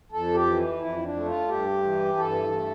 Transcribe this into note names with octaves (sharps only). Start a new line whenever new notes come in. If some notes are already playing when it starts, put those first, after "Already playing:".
F2 A4
G4
E3
F2 E4
D4
A3
F4
G2 G4
E3
G2 A4
A3